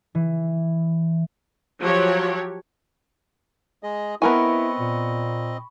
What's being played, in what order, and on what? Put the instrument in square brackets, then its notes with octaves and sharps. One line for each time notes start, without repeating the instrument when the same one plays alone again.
[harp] E3
[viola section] F3 F#3 G4 C#5
[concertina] G#3 G#4 D#5
[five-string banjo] B3 A#4 G#5 [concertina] C4 D#5 [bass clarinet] E4 [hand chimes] B5 C#6
[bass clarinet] A#2